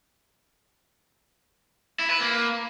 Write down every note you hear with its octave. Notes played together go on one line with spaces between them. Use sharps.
E4
B4
A#3